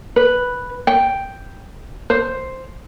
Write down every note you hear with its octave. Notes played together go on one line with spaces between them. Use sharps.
B4
G5
C5